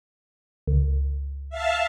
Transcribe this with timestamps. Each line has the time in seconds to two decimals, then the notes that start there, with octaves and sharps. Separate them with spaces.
0.67 C#2
1.50 E5 F5 A5